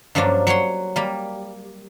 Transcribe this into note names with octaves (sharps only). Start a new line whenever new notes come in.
G2 F3 F#3 A#3 D4
F#3 C#5 F#5 C6
G3 A#3